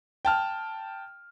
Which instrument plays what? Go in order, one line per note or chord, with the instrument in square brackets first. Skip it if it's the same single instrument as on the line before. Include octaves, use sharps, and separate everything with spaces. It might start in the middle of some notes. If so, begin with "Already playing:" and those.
[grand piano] G5 A5 F6